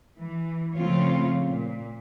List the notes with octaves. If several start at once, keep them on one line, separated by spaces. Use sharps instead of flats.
E3
C#3 F3 A3 C4 F4 C#5
A#2